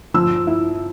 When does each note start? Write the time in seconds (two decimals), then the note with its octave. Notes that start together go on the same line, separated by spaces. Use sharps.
0.14 F3 E6
0.47 E4